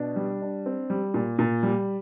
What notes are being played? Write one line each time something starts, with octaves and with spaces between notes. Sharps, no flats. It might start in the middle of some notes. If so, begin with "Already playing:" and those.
Already playing: B2 D4
G3
D4
C4
G3
A#2
A#2
G3